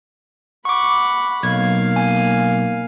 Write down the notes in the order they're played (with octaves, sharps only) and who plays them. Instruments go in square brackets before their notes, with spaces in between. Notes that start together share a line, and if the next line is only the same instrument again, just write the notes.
[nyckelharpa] F#5 B5 [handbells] C#6 D6
[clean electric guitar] B1 [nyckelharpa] A#3 F5 [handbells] G#6
[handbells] G#5